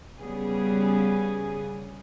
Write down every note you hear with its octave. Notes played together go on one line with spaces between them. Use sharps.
C#3 G3 B3 G#4